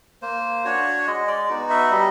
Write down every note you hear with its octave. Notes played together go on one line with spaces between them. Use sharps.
A#3 C5
D4 F#4 C#5
G#3 D#5
D5
B3 D#4 F#4
E5
G3 D#5